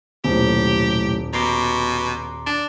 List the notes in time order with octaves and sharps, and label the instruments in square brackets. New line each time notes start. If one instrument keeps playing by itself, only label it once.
[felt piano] D#1 [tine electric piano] B1 A2 [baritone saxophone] G4
[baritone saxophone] B2 [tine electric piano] A#5 C6 D6
[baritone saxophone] D4